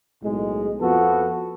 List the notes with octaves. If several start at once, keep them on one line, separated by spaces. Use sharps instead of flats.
B1 A2 G#3
F2 F3 B3 F#4 A4